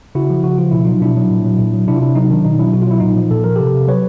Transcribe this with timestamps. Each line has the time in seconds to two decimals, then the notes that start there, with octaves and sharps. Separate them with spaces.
0.15 C#3 E4 F#4
0.30 F3
0.44 C#3 F#4
0.58 F3 F4
0.71 B2 E4
0.85 F#3 D#4 F4
1.02 B2 D4 E4
1.17 F#3
1.31 A#2
1.45 F#3
1.59 A#2
1.73 F#3
1.87 C3 D4 E4
1.96 F4
2.01 C3 D4 E4
2.16 F#3 D#4
2.30 D#3 D4
2.45 B2 D#4
2.59 F#3 D4 E4
2.74 B2 F#4
2.82 F4
2.87 F#3 E4
3.00 A#2 D#4 F4
3.17 F3
3.30 A#2 A4
3.44 F3 A#4
3.56 C3 G4 A4
3.74 C3
3.87 F#3 B4 C#5